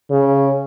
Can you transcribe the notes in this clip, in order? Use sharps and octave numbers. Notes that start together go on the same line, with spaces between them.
C#3